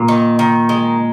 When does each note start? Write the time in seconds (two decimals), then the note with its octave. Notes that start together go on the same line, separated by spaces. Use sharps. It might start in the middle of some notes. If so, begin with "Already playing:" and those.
Already playing: A#2
0.08 D#3
0.39 D#3
0.69 G#3